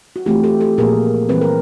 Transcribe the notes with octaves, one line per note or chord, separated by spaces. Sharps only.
F#4
E3 A3 C4 F4 G4
G4 A4
G4 A4
A#2 F3 A#3 G#4 A#4
E3 G3 C4 B4
A#4